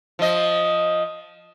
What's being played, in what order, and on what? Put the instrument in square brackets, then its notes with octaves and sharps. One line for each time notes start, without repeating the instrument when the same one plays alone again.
[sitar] F3 D#5